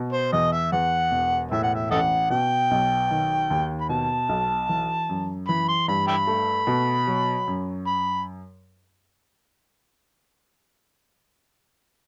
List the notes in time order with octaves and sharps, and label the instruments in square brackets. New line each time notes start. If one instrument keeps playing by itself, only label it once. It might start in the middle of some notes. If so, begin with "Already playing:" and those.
Already playing: [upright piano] B2
[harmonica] C5
[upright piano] E2 [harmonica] D#5
[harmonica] E5
[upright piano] E2 [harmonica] F#5
[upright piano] E1
[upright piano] A2 [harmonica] E5
[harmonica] F#5
E5
[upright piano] A1 [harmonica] A4 D#5 F#5
[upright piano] B2 [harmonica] G5
[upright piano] B1
D#3
D#2
[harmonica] B5
[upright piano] B2 [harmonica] A5
[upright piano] B1
E3
F#2
[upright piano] E3 [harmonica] B5
[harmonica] C6
[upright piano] G2 [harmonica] B5
[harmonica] E5 G5 B5
[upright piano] A3
B2
F#3
F#2
[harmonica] B5